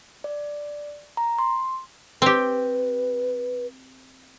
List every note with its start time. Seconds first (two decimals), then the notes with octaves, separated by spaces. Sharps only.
0.24 D5
1.17 A#5
1.39 C6
2.22 C4 G4 B4